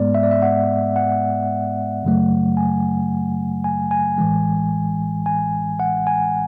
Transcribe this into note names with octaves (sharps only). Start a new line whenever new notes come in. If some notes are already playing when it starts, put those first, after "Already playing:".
Already playing: G#2 G#3 B3 D5
E5
D5
E5
F#5
F#5
F#2 C#3 F#3 A3
G#5
G#5
G#5
A1 A2 E3 G#3
G#5
F#5
G#5